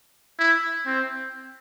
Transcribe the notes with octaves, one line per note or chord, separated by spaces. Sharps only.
E4
C4